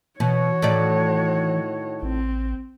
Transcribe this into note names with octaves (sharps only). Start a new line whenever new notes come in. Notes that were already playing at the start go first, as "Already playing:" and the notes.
B2 E3 F#4 C#5
A2 D#3 D5
A1 C4